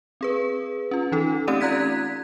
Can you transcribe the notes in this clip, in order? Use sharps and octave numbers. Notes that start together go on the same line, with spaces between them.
C4 G#4 B4
C#4 F4
E3 D#4 A4
A3 C4 C#4 G4 D5 D#7
F4 A#5 F#6 G#6 B6